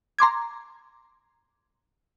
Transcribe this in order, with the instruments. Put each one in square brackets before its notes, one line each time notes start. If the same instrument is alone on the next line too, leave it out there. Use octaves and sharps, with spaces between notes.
[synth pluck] A#5 C6 D6 G#6